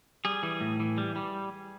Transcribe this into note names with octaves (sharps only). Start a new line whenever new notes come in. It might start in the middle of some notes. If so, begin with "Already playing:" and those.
G3 G#4
E3
A2
E3
G3
G3